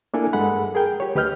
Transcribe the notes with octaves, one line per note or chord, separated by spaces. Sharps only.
A#3 D4 E4 A4 A#4 G#5
G2 G#3 G#4 A4 F#5 B5
G#4 A#4 G5
G4 C#5
D2 G4 B4 D#5 F6 G6